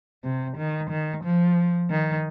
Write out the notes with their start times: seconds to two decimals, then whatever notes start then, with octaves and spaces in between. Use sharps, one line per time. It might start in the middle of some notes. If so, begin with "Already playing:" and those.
0.24 C3
0.57 D#3
0.90 D#3
1.24 F3
1.91 D#3